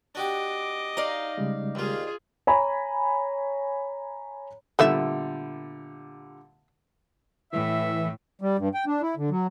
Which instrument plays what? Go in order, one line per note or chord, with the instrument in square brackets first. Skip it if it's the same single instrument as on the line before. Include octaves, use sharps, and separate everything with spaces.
[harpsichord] D4 F#4 G4 [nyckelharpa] D#5 D6
[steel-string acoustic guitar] D#4 D5 F5 [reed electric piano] A#5
[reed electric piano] C#3 G3 G#3
[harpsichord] D#2 A#3 [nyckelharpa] F4 G#4
[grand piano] C#5 G#5 A#5 B5
[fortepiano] A#2 D3 G3 [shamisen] A3 B3 E5
[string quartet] A2 [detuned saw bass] E3 [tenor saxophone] E5
[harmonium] G3
G2
G5
D4
E4
D3
F#3